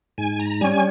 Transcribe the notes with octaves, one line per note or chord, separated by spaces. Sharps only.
G#2 G#5
A#5
G3 C#4 G#5